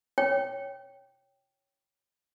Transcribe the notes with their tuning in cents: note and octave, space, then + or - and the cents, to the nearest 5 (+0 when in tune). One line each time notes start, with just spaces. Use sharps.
C#5 +0 G5 +0